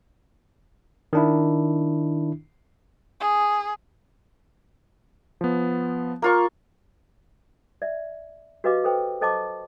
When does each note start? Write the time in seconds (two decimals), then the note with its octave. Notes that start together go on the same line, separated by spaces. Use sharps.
1.13 D#3 D4 E4
3.20 G#4
5.41 F3 B3
6.22 A#3 F4 C#6
7.82 D5 E5
8.64 F#4 G4 B4 D#5 F5 D6
8.84 A4 B4 C5 G5
9.21 A4 C5 D#5 A5 C#6 D6